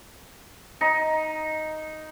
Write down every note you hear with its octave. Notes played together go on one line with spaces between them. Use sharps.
D#4